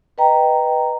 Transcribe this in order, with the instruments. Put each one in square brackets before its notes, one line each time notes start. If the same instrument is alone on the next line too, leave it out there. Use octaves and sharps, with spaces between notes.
[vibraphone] B4 D#5 G5 A#5